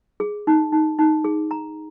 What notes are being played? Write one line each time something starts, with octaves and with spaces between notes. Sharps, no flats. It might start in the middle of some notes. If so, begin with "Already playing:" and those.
G#4
D#4
D#4
D#4
G#4
A#5